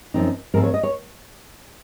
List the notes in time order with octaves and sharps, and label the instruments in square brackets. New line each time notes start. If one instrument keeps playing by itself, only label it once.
[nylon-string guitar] F#2 F3 C4 D#4
G#2 F3 G#3 C4 A#4
C#5
D#5
C#5